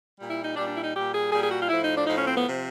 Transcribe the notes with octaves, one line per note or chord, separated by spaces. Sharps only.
A#2 G3
E4
D#4
A#2 G3 D4
D4
E4
D#4
A#2 G3 G4
G#4
A#2 G3 G#4
G#4
F#4
F4
A2 F3 E4
D#4
D4
A2 F3 D#4
C#4
C4
B3
C3 F3